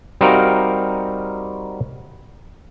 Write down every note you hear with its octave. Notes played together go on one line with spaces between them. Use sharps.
G3 C4 D#4 F#4 A#4 F5